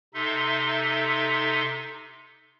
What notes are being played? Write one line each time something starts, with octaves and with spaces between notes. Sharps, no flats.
C3 D#4 A4 E5 C6